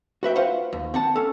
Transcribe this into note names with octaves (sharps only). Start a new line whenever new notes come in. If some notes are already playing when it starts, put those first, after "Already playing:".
F#4 B4 E5 G5
F4 B4 C5 F#5
D#2
C4 F#5 A5
C#4 A4